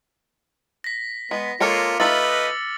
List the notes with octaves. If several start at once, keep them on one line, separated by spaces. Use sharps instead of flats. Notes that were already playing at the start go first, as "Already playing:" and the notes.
A#6 B6
G#3 B3
G#3 A#3 F4 A4 C#5 D6 F6 C#7
A3 D#4 F4 B4 D#5 E6 A6 F#7